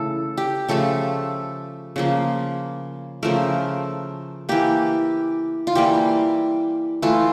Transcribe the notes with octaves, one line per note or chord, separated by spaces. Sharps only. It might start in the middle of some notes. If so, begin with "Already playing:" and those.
Already playing: C#3 E3 A3 A4
G4
C#3 F3 A3 A4
C#3 F3 A#3
C#3 F3 A3 A#4
E3 A#3 G4
F4
E3 G3 A#3 G4
E3 A3 F4